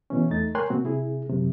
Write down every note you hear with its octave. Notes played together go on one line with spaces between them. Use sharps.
B2 E3 C#4
E2 A3 D#4 A6
A#4 C#5 G5 G#5 C6 F#6
B2 A#3 C4 F#4
C3 E4 G#4
F#2 C3